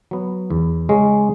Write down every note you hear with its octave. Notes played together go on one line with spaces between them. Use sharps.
F#3 B3
E2
C#3 G#3 C#4